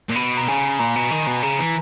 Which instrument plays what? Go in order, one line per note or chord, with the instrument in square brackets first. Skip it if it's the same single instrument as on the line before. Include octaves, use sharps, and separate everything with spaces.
[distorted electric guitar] A#2
[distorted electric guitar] B2 [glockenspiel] B5
[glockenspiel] A#5
[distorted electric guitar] C#3 [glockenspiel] G#5
[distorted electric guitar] A#2 [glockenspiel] A#5
[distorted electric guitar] B2
D#3
B2
[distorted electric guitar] C#3 [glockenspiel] A#5
[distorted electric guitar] E3